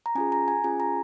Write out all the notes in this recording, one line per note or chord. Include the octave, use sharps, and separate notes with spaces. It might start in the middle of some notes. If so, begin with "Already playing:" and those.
A#5
C#4 F4 G#4 G#5
A#5
G#5
C#4 F4 G#4 G#5
A#5